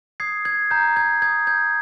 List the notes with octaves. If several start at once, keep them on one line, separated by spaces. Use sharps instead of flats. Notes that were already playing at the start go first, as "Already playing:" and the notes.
D#6 G#6 C7
D#6 G#6
A#5 G6
A#5 G#6
D#6 G#6
G6 G#6